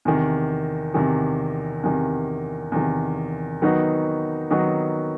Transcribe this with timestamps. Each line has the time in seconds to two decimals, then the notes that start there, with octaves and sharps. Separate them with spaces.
0.05 E2 C3 D#3
0.94 E2 C3 D#3
1.84 E2 C3 D#3
2.72 E2 C3 D#3
3.62 D#3 F#3 B3 D#4 F#4
4.50 D#3 F#3 B3 D#4 F#4